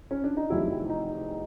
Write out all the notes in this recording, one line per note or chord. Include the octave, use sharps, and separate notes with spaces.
C#4
D4
D#4
F1 E2 C3 D#3 F#3 E4
E4
D#4